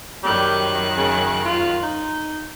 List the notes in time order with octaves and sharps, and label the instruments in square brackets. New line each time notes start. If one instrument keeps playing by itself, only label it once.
[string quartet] F#2 D#3 F#6 [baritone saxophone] G3
[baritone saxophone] C#3
F4
D#4